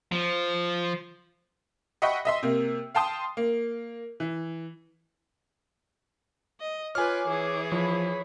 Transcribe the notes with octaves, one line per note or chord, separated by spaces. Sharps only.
F3
D#5 E5 F#5 G5 B5 C#6
D#5 E5 C6
C3 A#3
F5 G5 A5 C6 D#6
A#3
E3
D#5
F4 B4 C#5 G#5 D6 F6
E3 G#4
F3 C#5 B5